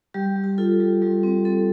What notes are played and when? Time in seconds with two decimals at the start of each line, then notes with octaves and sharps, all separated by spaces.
0.14 G3 G4
0.36 G3
0.44 G4
0.58 F4 A4
0.80 G3
1.02 G3
1.23 C4
1.45 C4 A4